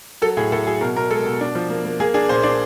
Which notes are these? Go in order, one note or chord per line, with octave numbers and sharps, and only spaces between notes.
F#3 A4
A2 G#4
A2 A4
F#3 G#4
B2 A#4
B2 A#4
G#3 A4
B2
D4
F3
A#3
A#3
A#3 G#4
D4 G#4
A#2 C5
D4 D5